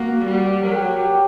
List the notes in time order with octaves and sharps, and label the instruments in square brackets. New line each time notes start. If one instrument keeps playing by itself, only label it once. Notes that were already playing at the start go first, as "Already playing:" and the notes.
Already playing: [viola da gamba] A#3 [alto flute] F#4
[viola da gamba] G3
[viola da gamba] F#3 [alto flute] A#4
[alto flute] G4
F#4
G4